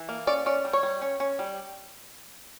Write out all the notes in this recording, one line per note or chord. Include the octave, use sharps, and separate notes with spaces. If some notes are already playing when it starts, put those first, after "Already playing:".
Already playing: E3
A#3
C#4 D5
C#4 D5
G3
C#5
G3
C#4
C#4
G3